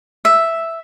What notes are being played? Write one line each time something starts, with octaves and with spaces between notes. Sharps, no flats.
E5